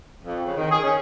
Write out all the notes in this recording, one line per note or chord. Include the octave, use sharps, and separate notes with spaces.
F2
C#3
D#3
G#4
C#4